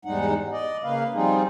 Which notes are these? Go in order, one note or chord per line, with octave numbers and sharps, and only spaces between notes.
E2 G#2 G3 G#3 D#4 F#5
D5 D#5
C#3 A#3 B4 F5
F3 G3 C4 D#4 F4 G#4